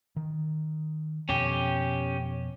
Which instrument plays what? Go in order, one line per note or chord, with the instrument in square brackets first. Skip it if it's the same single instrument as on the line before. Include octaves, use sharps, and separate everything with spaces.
[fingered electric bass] D#3
[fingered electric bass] F2 B2 [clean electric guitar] C#4 G4